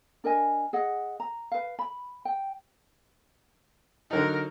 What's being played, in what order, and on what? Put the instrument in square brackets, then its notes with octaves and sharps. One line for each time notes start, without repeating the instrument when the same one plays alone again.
[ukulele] D4 A#4 D#5 G#5
G#4 D#5 F#5
A#5
B4 F5
B5
G5
[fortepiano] D3 F#3 D#4 [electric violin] A#4